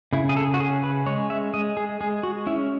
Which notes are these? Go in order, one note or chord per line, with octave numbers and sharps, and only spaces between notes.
C#3 E4
G#4
A4
F#4
C#4 G#4
B4
G#3 C#5
E5
G#3 D#5
G#4
G#3 G#4
F#4
C#4 E4